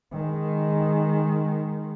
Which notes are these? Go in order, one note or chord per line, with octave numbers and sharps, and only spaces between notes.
D#3 G#3